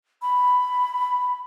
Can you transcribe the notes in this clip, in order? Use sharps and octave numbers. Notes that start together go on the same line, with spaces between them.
B5